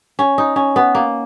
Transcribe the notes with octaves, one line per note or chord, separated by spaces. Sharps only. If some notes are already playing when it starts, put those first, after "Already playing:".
C#4
D#4
C#4
B3
A#3